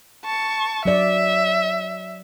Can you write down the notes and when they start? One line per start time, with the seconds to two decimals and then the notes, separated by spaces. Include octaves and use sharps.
0.24 A5 C#6
0.85 F#3 D5 E5